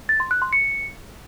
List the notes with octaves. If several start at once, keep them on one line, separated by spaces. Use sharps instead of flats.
A6
C6
F#6
C6
C#7